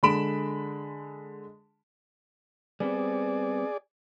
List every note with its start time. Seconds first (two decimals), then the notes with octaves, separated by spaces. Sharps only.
0.03 D3 G#3 B5 D7 E7
2.80 G3 B3 C4 G#4 D5